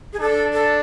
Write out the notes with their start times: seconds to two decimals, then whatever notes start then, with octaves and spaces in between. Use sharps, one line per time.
0.13 G#4
0.19 D4 A4
0.53 A4